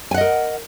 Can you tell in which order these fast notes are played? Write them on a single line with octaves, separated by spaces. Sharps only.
G#5 F#5 D#5 A#4